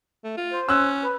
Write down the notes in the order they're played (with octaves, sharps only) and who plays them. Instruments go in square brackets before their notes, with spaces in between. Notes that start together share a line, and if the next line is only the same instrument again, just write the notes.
[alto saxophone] A3
F4
[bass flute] C5
[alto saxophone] C#4 [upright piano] E6 F#6
[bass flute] B4